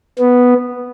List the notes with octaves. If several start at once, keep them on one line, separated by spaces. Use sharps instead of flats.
B3